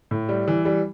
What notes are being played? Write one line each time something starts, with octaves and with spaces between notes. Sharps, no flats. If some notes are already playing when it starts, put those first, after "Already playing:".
A2
G3
E3
G3